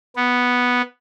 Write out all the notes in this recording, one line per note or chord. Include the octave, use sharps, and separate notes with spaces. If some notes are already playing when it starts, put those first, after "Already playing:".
B3